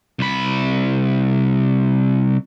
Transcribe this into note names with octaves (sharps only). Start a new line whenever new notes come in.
C2 B5